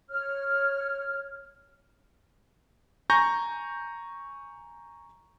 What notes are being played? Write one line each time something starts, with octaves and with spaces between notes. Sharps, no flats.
C#5 F6
G#5 A#5 C#6 G6 A#6